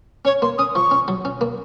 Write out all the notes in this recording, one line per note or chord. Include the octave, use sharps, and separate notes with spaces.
C#4 C#5
A#3 C6
C#4 D#6
F3 C#6
C#4
F#3
C#4
A#3